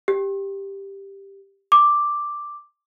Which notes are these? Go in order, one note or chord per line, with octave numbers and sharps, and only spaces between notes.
G4
D6